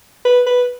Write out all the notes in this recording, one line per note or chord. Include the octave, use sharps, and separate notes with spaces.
B4
B4